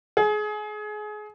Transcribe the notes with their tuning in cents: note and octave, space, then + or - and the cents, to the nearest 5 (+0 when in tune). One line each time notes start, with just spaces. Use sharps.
G#4 +25